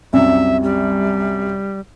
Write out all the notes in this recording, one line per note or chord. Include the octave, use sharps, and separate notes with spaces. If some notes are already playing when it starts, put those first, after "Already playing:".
C2 F#2 C3 E5
G3